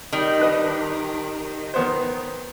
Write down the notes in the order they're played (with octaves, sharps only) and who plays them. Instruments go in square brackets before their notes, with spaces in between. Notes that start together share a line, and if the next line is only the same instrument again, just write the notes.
[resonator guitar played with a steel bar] D#3 G3
[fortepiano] D4 B4 D#5
D#3 B3 C5